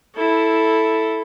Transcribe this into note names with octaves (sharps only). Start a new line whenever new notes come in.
E4 A4